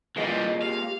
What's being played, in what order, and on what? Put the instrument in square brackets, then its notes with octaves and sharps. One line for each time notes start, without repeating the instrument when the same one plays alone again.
[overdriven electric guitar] E3 G3 [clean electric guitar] G#3 A#3 F4 [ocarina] D#5
[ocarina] G4 [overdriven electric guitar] F5